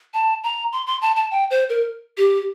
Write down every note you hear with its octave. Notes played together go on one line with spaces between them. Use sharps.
A5
A#5
C6
C6
A5
A5
G5
C5
A#4
G4